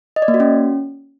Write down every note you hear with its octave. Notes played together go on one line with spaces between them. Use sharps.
D#5
D5
A#3
F#4
C#4